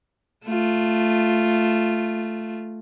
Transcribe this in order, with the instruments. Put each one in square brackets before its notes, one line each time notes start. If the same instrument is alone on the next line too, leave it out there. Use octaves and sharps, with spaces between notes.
[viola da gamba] A3 F4